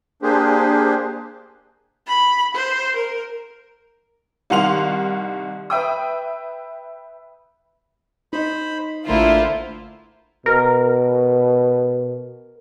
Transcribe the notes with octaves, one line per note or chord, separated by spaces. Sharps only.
A#3 D4 G4 G#4 C5
B5
C5
A#4
C2 D#3 F5 F#5 C6 F7
B4 E5 G5 D#6
D#4 C5 D#5 B5
A1 D3 A3 A#3 E4 F4 C5 A#5
B2 A#4